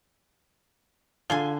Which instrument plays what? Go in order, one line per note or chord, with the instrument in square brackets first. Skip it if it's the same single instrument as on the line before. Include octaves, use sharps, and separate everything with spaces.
[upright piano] D3 G7 [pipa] F4 G#4 G#5